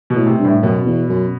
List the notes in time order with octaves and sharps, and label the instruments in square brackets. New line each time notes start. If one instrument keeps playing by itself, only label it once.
[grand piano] B2
[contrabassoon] A2
[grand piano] C3
[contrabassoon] G2
[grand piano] A2
[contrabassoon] F#2 [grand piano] B2
[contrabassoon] E2
F#2